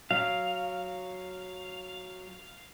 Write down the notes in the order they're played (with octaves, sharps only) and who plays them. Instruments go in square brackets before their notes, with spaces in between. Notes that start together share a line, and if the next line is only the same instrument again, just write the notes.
[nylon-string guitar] F#3 [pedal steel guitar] F5